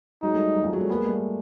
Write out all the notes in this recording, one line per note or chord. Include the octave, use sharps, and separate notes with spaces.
F#3 G#3 D#4
G3 A3
F#3
F3 G3
F#3 G#3
G3 A3
G#3 A#3 B3
G3 A3